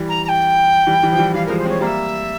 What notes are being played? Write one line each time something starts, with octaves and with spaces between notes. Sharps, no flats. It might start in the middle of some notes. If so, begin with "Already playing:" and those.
Already playing: E3 G3
A#5
A#5
G5
E3 G3
E3 G3
F3
E3 G3
E3 G3 F5
F3 G#3 A#4
C5
G#3 C4
C#5
G3 A#3 E5 F5